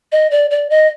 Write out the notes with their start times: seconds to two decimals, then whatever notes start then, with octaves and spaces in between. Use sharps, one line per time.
0.12 D#5
0.31 D5
0.51 D5
0.70 D#5